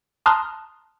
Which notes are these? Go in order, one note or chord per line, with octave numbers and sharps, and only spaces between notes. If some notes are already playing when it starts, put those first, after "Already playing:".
A5 A#5 C6 D#6 F6 F#6